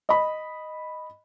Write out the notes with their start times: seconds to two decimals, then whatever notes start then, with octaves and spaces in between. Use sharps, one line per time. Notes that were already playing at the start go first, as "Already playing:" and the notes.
0.09 D#5 B5